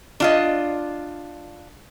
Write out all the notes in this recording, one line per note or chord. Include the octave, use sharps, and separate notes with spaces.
D4 F4 D#5